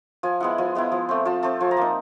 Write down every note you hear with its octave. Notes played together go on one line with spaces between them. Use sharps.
F3 G#5
G#3 B3 E4 F#5
F3 G#5
G#3 B3 E4
F3
A3 C4
F3 A5
A3 C4 A5
F3 G#5
A#5
A#3 D#4 A5